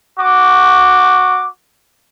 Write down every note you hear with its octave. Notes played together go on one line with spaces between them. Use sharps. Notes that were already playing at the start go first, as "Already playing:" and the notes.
F#4 C#6 D6